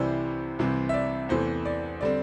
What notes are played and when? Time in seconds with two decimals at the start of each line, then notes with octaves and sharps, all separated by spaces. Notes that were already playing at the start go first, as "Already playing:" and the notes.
Already playing: C2 C3 E3 G3 E4 C5
0.59 C2 C3 E3 C4
0.89 E5
0.94 D5
1.29 E2 C3 E3 A3 C5
1.65 D5
2.01 D3 G3 C4 D5